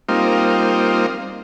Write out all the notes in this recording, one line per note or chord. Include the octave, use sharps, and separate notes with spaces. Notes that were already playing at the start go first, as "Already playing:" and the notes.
G3 A#3 C4 D#4 F4